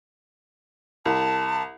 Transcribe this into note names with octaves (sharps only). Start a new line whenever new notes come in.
C2 A5